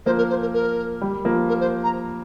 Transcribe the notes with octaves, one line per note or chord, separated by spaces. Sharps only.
F3 A#3 C5
A#4
C5
A#4
A#4
G3
F3 A#3
A#4
C5
A#5